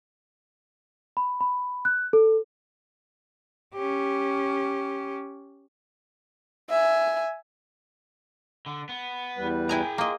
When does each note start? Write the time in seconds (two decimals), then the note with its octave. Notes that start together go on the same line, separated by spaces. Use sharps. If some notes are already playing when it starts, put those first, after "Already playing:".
1.17 B5
1.41 B5
1.85 F#6
2.13 A4
3.74 C#4 G4
6.70 E5 G#5
8.66 D3
8.89 B3
9.38 E2 G3 B4
9.69 E4 G#4 G5 G#5 A#5
9.98 A#3 F4 D#5